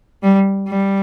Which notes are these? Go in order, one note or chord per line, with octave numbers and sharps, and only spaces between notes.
G3
G3